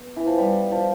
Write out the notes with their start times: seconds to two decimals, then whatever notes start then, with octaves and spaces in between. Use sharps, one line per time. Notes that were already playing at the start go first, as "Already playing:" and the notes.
Already playing: B3
0.16 E3
0.27 F3
0.38 G3
0.72 F3